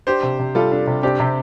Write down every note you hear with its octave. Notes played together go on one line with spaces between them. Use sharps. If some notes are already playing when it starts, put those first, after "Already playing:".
D4 G4 C5
C3
C3
G3 F4 A4
D4
C3
C4 D4 G4
C3